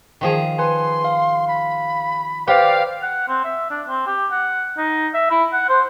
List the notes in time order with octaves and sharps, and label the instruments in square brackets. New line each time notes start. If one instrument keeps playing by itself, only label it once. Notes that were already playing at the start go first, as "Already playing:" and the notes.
[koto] D#3 F3 G#4
[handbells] B4 G#5 [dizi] C6
[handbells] F5
[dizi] B5
[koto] G4 [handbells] B4 C5 G5 [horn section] D5 F5
[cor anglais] F#5
C4
E5
D4
C4
G4
F#5
D#4
E5
E4
F#5
C5